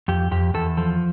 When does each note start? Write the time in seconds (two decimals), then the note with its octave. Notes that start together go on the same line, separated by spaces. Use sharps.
0.08 F2 G4
0.31 F2 G4
0.54 E2 A4
0.77 F3 A4